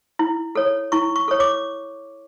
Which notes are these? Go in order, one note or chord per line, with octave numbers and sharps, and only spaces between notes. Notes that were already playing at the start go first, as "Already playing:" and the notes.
E4
A4 C#5
E4 C#6
C#6
A4 C#5
D6